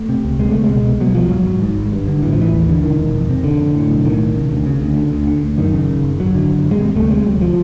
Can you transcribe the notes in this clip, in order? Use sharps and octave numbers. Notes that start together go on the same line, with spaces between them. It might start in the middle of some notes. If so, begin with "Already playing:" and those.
Already playing: A3
C3
C#2
C3 G#3
C#2 A3
G#3
B2
C2
B2 F#3
C2 F3
G#2 F#3
G#1
G#2
G#1
G2
D3
A1 E3
F3
A1 E3
D#2
D3
E1 D#3
E1
F2
C3
F1 D3
F1
A2
B1
A2 D#3
B1
C#3
D2
C#3
D2
D3
D2
D3
D2
F#2 D#3
C#3
G#1
G#1
F#2 F#3
D3
G#1
G#1
G#3
C3 G3
D2 A3
C3 G#3
D2 F#3
F3